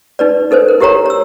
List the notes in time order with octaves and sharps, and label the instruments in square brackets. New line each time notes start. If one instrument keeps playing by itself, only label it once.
[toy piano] D#4 B4 D5
D#4 A4 B4 C5
A#4
E4 G4 A#4 C#5 A#5
C#5 E6